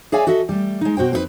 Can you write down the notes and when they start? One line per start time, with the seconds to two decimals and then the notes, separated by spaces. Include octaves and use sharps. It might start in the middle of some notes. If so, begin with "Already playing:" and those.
0.12 G#4 C#5 D5 E5 F5 G#5
0.27 F#4 A4 D#5 E5
0.49 G3 A3
0.81 G#3 D#4
0.97 B2 F#4 C5 G5
1.12 F2 C4 D#4 E4 B4